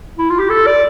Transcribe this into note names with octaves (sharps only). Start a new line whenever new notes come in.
E4
F4
G4
A4
D5